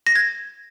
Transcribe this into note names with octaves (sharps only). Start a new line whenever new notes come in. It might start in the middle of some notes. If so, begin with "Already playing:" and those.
A#6
G#6